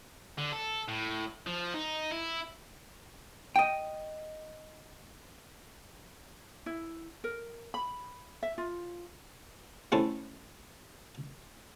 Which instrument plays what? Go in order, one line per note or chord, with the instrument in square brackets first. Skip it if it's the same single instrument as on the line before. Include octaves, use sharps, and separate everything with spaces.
[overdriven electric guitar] D3
A4
A2
F3
D#4
E4
[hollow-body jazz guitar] D#5 G5
[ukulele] E4
A#4
B5
E5
F4
[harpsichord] A3 C4 C#4 E4 A4